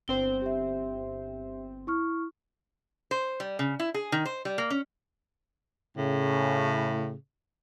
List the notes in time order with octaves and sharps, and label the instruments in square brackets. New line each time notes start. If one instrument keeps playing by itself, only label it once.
[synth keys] G1 C4 C5 [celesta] G7
[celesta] G4 E5
E4 C#6 F6
[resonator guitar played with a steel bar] C5
G3
C#3
E4
G#4
D#3
C5
G3
A#3
C#4
[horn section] A2 C#3